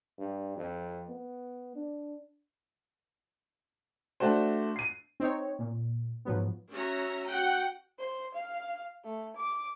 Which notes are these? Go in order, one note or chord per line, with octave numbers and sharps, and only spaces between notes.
G2
F2
B3
D4
A3 D4 F#4 C5
C7 D#7
C4 D#4 C#5
A#2
G#2 F3 F#3 B3
C#4 F#4 E5 A#5
F#4 F#5 G5
C5
F5
A3
D6